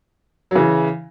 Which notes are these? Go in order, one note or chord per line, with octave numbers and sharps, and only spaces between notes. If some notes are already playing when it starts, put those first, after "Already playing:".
F#3
C#3 E3